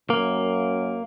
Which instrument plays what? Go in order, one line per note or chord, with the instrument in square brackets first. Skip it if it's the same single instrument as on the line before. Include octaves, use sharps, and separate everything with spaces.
[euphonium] F#2 [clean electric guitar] A#3